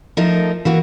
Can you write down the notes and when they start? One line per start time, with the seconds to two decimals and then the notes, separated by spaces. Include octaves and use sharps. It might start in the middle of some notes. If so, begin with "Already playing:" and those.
0.17 F3 A3 D#4 A#4
0.65 E3 A#3 F#4